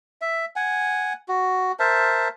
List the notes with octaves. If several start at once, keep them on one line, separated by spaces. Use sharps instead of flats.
E5
F#5 G#5
F#4
A#4 C5 E5 A5